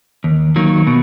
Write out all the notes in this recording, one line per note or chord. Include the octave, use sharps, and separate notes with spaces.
D#2
D#3 F#3 A#3
B2